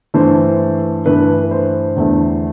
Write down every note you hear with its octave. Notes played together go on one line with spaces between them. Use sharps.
G2 E3 A3 C5
G2 E3 A3 B4
B4
C5
E2 D3 A3